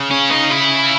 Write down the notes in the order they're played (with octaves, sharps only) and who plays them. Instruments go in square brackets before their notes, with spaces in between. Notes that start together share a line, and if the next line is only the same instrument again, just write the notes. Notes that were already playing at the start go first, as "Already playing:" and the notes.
Already playing: [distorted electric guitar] C#3
[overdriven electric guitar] C#4
D#4
E4